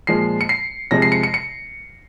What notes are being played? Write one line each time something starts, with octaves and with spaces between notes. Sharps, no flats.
A#2 F3 G#3 C7
C#7
C7
C3 F3 G#3 A#6
C7
C#7
C#7
C#7